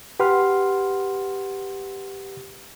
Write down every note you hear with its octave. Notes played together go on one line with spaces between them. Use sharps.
G4 B4 F#5 C6 F6